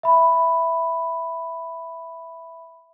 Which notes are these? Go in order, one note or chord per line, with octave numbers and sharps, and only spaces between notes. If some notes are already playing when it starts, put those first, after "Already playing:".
E5 B5